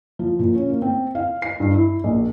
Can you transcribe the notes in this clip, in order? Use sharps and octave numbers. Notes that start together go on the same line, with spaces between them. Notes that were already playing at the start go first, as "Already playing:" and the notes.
F3
A#2
C#4
A#3
C4
F5
C7
G2
E4
A#1